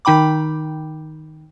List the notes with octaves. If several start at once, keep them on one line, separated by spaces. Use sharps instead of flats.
D#3 D#4 G5 B5 D6